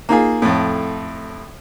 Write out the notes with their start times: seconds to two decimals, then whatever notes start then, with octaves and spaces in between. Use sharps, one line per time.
0.09 A#3 D#4 F4 G#4
0.42 F2 A2